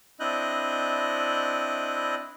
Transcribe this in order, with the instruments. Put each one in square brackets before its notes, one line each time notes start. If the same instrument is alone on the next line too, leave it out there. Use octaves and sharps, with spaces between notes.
[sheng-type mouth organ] C4 D4 E4 D#5 F#6 G6